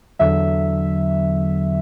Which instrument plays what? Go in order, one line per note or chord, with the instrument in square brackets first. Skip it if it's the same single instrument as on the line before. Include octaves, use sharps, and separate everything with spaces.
[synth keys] E2 D3 F#3 E5